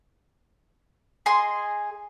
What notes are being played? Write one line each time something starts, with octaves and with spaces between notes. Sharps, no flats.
G#4 D#5 C6